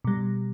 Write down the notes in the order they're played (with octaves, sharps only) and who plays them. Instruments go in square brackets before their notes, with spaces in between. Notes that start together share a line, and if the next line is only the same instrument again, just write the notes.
[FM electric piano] B2 G3